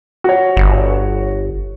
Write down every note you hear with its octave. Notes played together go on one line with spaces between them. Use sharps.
F#4 C#5
G1